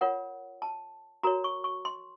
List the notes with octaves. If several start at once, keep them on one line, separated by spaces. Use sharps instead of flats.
F4 A#4 C#5 F#5
A5
F#4 A#4 C#5 A#5
C#6
C#6
C6